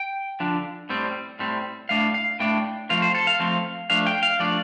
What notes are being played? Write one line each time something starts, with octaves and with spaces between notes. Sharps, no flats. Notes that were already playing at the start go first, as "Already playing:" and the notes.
Already playing: G5
D3 F3 D4
A2 G3 C4
A2 G3 C4
A2 A3 D4 F5
F5
A2 A3 D4 G5
F3 A3 C4 F5
C5
A4
F5
F3 A3 C4
F3 A3 D4 F5
G5
F5
F3 A3 D4 D5